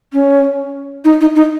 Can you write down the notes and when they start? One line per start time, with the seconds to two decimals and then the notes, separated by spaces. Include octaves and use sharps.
0.13 C#4
1.04 D#4
1.21 D#4
1.35 D#4